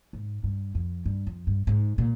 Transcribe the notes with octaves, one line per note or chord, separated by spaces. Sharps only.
G#2
G2
F2
G2
F2
G2
G#2
A#2